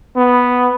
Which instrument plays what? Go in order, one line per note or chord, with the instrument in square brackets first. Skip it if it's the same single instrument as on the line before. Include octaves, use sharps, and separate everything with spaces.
[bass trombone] B3